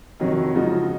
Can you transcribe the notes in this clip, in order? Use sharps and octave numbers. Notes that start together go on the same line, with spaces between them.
F2 C3 D#3 F#3 C#4
C#3 F3 G#3 D#4 F#4